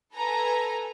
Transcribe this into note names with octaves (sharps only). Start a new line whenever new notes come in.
A4 B4 G#5 A#5